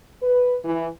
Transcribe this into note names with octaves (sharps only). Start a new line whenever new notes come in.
B4
E3